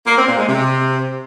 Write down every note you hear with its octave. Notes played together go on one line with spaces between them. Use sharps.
A#3
C4
A#2
G#3
C3